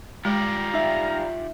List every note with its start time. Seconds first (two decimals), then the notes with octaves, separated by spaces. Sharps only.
0.25 G3 G#3 F4 G4 D5 F5 A#5
0.74 D#4 E5